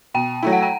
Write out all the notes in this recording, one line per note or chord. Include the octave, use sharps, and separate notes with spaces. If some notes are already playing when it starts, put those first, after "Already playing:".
B2 G5
F#3 A3 E4
F#5
G5